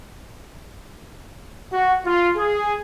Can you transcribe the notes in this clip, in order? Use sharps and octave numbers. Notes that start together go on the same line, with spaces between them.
F#4
F4
G#4